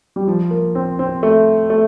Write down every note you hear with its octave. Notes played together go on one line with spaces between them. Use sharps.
G3
F3
A#3
C4
C4
A3
A3